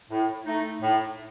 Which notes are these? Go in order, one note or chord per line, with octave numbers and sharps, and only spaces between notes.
A2
A3 D#4
A2